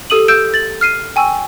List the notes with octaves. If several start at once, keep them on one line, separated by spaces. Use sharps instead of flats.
G4 A4 D#6 D#7 F#7
E6 G6 D7 E7
A6 F#7
F6 C7 D#7
G5 G#5 C#6 E6